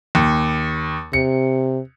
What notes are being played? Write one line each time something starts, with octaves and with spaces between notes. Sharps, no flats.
D#2
C3 C#7